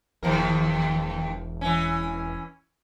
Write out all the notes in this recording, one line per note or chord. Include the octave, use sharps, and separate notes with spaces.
E1 D#2 F3 A#4
E3 C#4